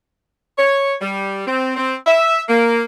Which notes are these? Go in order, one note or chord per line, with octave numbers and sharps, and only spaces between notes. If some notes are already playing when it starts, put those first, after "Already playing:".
C#5
G3
C4
C4
E5
A#3